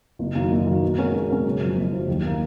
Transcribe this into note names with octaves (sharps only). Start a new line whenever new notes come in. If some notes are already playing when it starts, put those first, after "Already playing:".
F#1
F#2 D#3 A#3
F#1
F#2 D#3 A#3
B2
G#3 C#4 F#4 A#4
B2
G#3 C#4 F#4 A#4
F#1
F#2 F3
F#1
F#2 F3
D#2
D#3 A#3